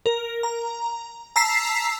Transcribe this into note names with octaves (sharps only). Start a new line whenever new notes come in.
A#4
A#5
A5 A#5 E6 B6 C7